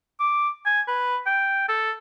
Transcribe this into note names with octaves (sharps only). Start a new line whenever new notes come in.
D6
G#5
B4
G5
A4